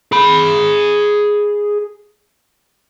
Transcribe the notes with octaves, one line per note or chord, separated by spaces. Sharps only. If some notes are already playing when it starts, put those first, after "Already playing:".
G#4 B5